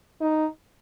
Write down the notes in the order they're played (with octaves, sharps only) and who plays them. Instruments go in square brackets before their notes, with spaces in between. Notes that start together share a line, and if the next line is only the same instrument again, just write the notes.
[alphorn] D#4